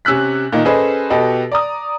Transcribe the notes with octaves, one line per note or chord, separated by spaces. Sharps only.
C3 C#4 E6 F#6 B6
A#2 D#3 D#4
C#4 G#4 A4 B4 C5 D#5
B2 G4 A4 B4 D#5
D5 A#5 D#6